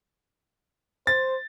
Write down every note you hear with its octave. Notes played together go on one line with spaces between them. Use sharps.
C5 A6